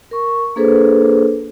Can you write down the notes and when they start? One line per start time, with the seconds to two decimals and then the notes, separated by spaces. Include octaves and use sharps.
0.11 A#4 C#6
0.56 A#3 D4 G#4 A4 B4 C5